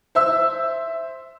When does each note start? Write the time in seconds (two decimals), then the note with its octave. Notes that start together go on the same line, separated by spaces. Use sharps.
0.15 C5 E5 E6